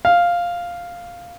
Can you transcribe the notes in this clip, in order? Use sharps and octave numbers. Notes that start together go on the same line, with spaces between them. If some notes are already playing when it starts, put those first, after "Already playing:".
F5